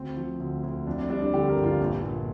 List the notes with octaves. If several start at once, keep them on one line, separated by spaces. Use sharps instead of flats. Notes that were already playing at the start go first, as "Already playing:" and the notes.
Already playing: D2 C4
F3
D2
D2
F2 D4
D4
G3 D4
D4
D3 G4
A#4
G1
F4
A#1
A#2